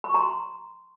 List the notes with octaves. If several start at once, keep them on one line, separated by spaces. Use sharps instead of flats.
B5
C#6
A#5
C6